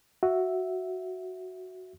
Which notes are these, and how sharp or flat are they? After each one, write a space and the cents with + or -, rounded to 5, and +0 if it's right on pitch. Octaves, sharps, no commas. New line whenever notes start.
F#4 +0 E5 +0